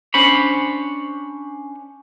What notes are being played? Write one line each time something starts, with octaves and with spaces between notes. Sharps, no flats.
C#4 D4 C5 C#5 B5